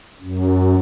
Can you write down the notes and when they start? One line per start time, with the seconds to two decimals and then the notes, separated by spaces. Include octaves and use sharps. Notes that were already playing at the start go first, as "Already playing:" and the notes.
0.21 F#2